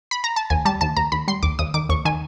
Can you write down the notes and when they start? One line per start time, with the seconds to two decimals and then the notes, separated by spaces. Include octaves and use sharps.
0.11 B5
0.24 A#5
0.36 A5
0.50 D#2 G#5
0.65 G3 A5
0.81 D#2 A5
0.97 D#2 A#5
1.12 D#2 B5
1.28 G3 C6
1.43 D#2 D6
1.59 D#2 D#6
1.74 D#3 D6
1.89 D#2 C#6
2.05 D#3 G#5